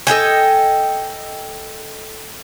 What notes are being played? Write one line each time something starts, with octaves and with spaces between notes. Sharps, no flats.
A4 D#5 G5 G#5